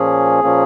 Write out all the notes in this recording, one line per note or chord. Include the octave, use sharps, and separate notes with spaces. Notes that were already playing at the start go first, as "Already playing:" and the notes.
Already playing: A#2 F3 A#3 C#4 G#4
A#2 F3 A#3 C#4